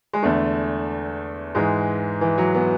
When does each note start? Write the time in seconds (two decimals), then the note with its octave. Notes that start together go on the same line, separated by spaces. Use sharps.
0.13 G#3
0.22 E2 D3 A3
1.55 G#2 E3 G#3
2.21 E3
2.38 F#3
2.54 B3